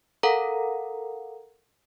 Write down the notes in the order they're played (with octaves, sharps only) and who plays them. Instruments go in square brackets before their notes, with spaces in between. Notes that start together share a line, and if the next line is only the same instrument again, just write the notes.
[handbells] A4 A#4 F5 F#5 A#5